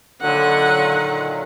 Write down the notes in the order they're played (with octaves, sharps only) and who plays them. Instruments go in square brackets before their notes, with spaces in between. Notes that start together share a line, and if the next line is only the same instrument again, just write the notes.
[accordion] A#2 D#3 F#3 [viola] D3 F#5